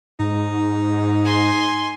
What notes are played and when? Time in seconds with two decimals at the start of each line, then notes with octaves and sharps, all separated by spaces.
0.19 G#2 D#4
1.25 G#5 C6